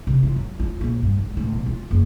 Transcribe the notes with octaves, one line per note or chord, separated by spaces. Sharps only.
C3
F4
F#3
F4
A#1
G2
G#1
D1
B2
F4
F#1